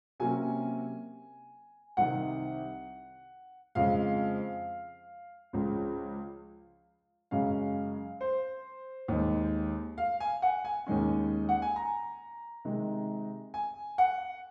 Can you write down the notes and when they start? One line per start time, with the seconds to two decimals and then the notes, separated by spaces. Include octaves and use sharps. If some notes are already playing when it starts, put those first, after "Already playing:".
0.20 C3 F#3 A#3 C#4 G#5
1.97 C2 C3 D#3 F#5
3.75 F2 C#3 G#3 F5
5.53 C#2 C#3 F3
7.31 F#2 C#3 G#3 C#4 F5
8.21 C5
9.08 D#2 D#3 G#3
9.98 F5
10.20 G#5
10.42 F#5
10.65 G#5
10.87 D#2 D#3 G#3 C#4
11.49 F#5
11.62 G#5
11.76 A#5
12.65 C3 D#3 G#3
13.54 G#5
13.98 F#5